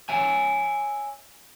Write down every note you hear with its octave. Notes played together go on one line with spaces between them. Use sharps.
C#5 E5 G#5